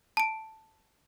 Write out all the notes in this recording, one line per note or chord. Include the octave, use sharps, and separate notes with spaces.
A5 D7